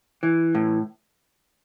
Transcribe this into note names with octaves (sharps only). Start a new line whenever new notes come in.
E3
A2